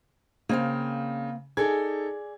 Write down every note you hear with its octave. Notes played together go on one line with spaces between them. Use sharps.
C#3 A#3 C4 F5
D#4 G#4 A4 D5 G#6